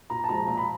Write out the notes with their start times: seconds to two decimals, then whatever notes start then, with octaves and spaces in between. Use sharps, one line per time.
0.10 A#2 A#5
0.24 A5
0.29 F3 G#3 A#5
0.47 A#2 A#5
0.57 B5